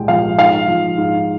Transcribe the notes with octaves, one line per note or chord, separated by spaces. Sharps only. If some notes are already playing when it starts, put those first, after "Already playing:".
Already playing: C2 A#2 G#3 G5
F3 F5
G#2 F5
F3
G#2